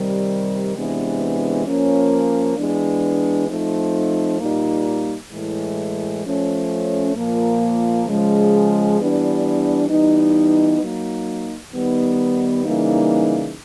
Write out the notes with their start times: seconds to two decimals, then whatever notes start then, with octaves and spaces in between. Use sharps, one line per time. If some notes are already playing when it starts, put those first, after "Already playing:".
Already playing: C3 D#3 G3
0.74 C3 E3 G#3 B3 D4
1.65 F3 A#3 C#4
2.57 E3 G#3 B3 D4
3.48 F3 A3 C4 D#4
4.40 A#2 G3 A#3 D#4
5.31 A2 E3 G#3
6.23 F3 A3 C#4
7.15 A#2 F3 A#3
8.06 C#3 F3 G#3
8.98 E3 G3 B3 D4
9.89 E3 G3 B3 D#4
10.81 F#3 A#3 D#4
11.72 D#3 G3 B3 D#4
12.64 C#3 E3 G3 A#3 D#4